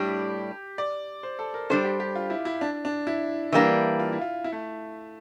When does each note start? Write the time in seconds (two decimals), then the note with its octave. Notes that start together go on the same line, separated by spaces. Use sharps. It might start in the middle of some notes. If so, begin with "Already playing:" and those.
Already playing: A2 G3 D4 G4
0.78 D5
1.23 C5
1.39 A4
1.54 A#4
1.70 G3 D4 G4 A4 C5
1.85 G4
2.00 G4
2.16 F4
2.30 E4
2.45 E4
2.61 D4
2.85 D4
3.07 E4
3.52 E3 G3 A#3 D4
3.99 F4
4.13 E4
4.21 F4
4.44 E4
4.52 A3